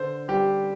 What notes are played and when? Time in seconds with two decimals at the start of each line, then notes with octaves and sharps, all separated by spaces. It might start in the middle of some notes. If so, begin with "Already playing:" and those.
Already playing: D3 C5
0.28 G3 G4